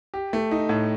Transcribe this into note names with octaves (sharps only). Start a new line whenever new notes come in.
G4
A3
D#4
A2